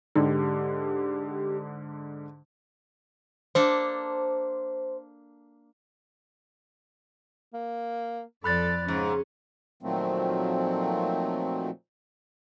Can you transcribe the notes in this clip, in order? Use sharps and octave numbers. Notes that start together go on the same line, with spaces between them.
G#2 D3 D4 D#4 G4
A#3 D4 A4 C5
A#3
F2 A4 D5 B5 F#6 A6
G#2 C#3 C#4
A#2 D#3 F3 F#3 A3 C4